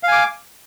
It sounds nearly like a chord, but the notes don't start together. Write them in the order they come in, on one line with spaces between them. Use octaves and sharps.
F5 G#5 D6